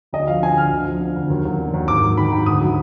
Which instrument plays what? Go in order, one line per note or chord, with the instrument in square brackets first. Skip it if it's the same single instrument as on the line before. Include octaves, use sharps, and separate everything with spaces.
[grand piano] D2 D#5
F3 F5
D3 G#5
D2 F6
D2
F3
D3
D2
D#2
F#3
D3
D#2
G#2 D6
F#3
D#3 B5
G#2
D2 D#6
F#3